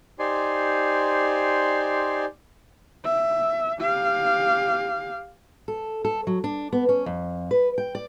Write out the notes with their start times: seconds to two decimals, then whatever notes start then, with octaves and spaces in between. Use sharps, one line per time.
0.19 D#4 G4 C5 D5 G#5 C6
3.04 E5
3.80 G4 F5
5.68 A4
6.05 A4
6.27 F#3
6.44 D4
6.72 B3
6.89 C#4
7.06 F2
7.51 B4
7.78 G5
7.95 D5